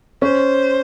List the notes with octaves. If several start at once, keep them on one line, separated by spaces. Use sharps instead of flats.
C#4 C5